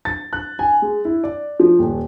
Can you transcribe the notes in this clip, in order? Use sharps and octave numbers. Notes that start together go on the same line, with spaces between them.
A6
F#6
G#5
G#3
E4
D5
F3
D#1